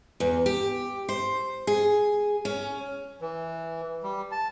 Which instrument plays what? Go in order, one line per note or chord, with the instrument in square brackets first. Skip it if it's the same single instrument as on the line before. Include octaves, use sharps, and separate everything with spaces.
[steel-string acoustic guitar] E2
G4
C5
G#4
C#4
[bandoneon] E3
G3
A5